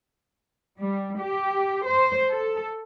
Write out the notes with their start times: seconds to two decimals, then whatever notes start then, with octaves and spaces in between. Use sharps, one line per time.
0.80 G3
1.19 G4
1.87 C5
2.30 A4